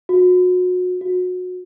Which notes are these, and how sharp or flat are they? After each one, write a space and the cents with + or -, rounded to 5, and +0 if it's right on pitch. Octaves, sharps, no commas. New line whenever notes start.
F#4 -30
F#4 -25